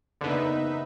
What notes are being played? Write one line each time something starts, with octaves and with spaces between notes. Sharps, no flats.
F#1 E2 B2 D3 D#4 B4 E5